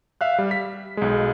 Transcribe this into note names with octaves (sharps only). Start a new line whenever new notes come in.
E5 F5 F#6
G3
B6
B1 G#3